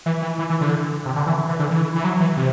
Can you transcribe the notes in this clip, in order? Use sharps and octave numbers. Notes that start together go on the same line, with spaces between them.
E3
E3
E3
E3
D3
C3
D3
E3
E3
D3
E3
E3
F#3
E3
C3